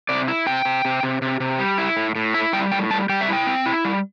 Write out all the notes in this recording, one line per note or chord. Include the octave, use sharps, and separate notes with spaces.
C3 D5
E4
C3 G5
C3
C3
C3
C3
C3
G3
E4
A2
A2
E4 E5
G3 G5
A2 G5
G3 A5
G3 G5
E5
E4 G5
C4
E4
G3